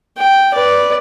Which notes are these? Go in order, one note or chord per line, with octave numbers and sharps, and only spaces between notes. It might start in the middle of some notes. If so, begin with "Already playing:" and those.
G5
B4 D5